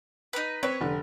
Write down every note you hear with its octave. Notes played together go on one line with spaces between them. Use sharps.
D#4 B4
C4 B4 C#5
F1 D3